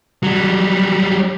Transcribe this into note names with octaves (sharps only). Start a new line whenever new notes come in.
F#3 G3